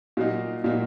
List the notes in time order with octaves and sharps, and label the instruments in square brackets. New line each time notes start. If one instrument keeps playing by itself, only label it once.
[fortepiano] A#2 F#3 A#3 D#4
A#2 F#3 A#3 D#4